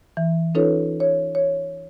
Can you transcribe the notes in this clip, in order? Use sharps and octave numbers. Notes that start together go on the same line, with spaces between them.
E3
C#4 D#4 F4 A4 B4 C#5
C#5
C#5